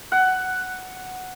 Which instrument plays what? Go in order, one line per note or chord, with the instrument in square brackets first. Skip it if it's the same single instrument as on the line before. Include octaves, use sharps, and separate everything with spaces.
[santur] F#5